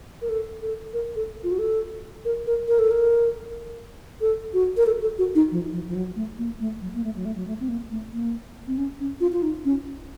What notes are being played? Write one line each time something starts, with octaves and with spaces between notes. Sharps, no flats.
A#4
A4
A4
A#4
A4
F4
F#4
A4
A#4
A#4
A#4
A4
A#4
A4
F#4
A#4
A4
A4
F#4
D#4
F3
F3
F3
F#3
A3
A#3
A3
F#3
A#3
A3
F#3
A3
F#3
A3
C4
A#3
A3
A#3
C4
C#4
C#4
F4
F4
D#4
C#4